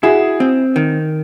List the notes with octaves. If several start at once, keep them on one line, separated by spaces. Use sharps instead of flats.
E4 F#4 G#4
C4
D#3